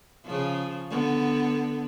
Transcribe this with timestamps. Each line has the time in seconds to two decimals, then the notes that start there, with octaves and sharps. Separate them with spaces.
0.25 C#3 F3
0.90 D3 B3